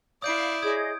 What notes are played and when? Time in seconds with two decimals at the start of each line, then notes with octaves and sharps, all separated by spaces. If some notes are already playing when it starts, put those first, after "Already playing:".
0.22 E4 D5 F5 D#6 G6 D7
0.62 G#4 C#5 D#5 D#6 G#6